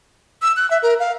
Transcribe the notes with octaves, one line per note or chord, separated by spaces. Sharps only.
E6
F#6
E5
A#4
F5